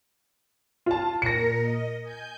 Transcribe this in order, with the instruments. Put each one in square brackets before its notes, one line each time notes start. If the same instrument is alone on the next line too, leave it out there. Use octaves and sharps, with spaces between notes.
[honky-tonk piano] F4 A5
[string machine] A#2 A#4 [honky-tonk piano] A#6 C#7
[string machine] D#5
G#5 G6